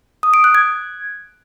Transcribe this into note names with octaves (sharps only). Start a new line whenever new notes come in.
D#6
D7
F#6
G#6